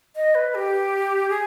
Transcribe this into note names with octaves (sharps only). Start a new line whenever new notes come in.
D#5
B4
G4
G#4